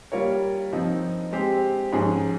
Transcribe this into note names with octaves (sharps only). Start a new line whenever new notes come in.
G3 A#3 F4 A#4 C#5
F3 C4 D#4
G#3 C4 G4 C5
G#2 F3 G#3 C#4 G#4